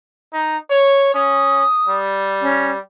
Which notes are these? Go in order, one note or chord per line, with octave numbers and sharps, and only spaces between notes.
D#4
C#5
C#4 D#6
G3
C#4